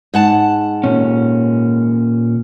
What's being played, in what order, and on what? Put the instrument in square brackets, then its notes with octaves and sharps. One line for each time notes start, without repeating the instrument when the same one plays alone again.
[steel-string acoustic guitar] G#2 F#5 A5
[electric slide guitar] A#2 C#4